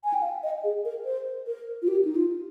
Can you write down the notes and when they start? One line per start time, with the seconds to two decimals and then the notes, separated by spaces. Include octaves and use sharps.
0.04 G#5
0.14 G5
0.22 F5
0.43 D#5
0.64 G#4
0.85 A#4
1.05 C5
1.47 A#4
1.82 F4
1.88 G4
2.05 D#4
2.16 F4